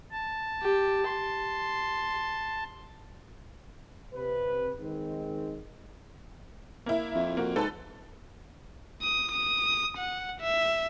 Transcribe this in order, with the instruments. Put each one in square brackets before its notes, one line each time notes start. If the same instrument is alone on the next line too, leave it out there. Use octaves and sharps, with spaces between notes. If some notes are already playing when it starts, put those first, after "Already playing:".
[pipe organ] A5
[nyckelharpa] G4
C6
[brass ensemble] C3 B4
D#3 G#3 C4
[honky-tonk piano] A#3 E4
[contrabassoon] F2
[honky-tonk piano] A#3 F#4
[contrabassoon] G#2 [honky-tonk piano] A4 B4 A5
[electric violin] D#6
D#6
F#5
E5